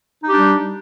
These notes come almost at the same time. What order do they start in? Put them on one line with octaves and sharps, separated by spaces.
D#4 G4 D4 G3